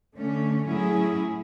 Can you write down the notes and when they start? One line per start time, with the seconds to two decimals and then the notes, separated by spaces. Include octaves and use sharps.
0.16 D3 A3 C#4
0.66 A2 F#3 C#4 E4 G#4